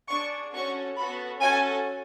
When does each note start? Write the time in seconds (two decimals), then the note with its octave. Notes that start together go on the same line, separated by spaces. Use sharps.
0.09 D4 G#4 C#6
0.53 C#4 F#4 A4 C#6
0.97 B3 F#4 A4 B5
1.40 C#4 F#4 A4 G#5